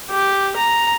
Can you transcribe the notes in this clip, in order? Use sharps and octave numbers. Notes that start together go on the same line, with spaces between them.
G4
A#5